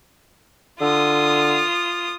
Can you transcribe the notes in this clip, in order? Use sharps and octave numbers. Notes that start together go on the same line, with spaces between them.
D3 F4 D#6